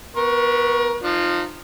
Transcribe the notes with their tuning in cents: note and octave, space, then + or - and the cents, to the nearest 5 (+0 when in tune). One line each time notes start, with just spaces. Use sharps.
B3 +0 A#4 +35 C#6 +0
F3 +0 D#4 -35